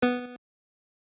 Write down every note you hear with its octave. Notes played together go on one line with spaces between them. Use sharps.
B3 B4